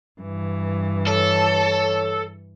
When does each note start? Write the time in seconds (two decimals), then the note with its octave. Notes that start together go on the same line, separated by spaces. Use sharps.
0.21 G2 E3
1.08 A4 C#5